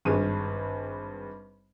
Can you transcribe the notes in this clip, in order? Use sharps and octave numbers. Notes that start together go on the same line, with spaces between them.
G#1 G2 G#4 D#7